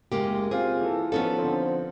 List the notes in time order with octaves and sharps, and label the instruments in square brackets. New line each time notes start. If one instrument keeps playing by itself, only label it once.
[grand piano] F#1 [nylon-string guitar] G#3 A#3 G4
[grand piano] C4 F4 [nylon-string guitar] G#4
[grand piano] E3 A4
[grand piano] F3 D#4 [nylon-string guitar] B3 C#4 A4
[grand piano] D3 F3 C4